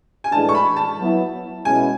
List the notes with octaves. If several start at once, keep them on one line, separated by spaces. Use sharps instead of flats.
G#5
A2 E3 G#3 D4 A5
C#6
B5
A5
F#3 B3 E4
B2 G#3 C#4 E4 G#5